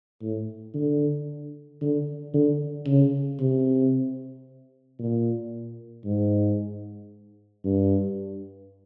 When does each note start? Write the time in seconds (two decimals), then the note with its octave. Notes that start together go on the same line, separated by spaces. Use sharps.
0.22 A2
0.74 D3
1.81 D3
2.34 D3
2.87 C#3
3.40 C3
4.99 A#2
6.05 G#2
7.65 G2